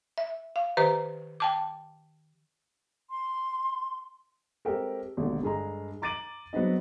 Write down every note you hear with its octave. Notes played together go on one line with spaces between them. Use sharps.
E5
F5
D#3 G4 B4 C5 A#5
G5 A5 D6
C6
G#3 C4 G4 A4 A#4
G#1 D#2 B2 D3
G2 G#3 G#4 A4 A#5
A#5 D6 A6 D7 D#7 F#7
F#3 G#3 B3 C4 D4 D#5